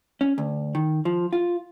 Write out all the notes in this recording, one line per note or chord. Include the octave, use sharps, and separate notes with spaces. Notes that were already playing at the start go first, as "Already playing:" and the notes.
C#4
D2
D#3
F3
F4